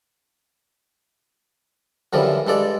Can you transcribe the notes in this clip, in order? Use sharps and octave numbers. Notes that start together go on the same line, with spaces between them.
F#2 D3 E3 F3 G3
G2 G#3 A4 D5